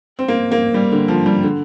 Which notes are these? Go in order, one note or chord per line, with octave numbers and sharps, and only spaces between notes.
C4
A#3
A#3
G3
D3
F3
G3
D3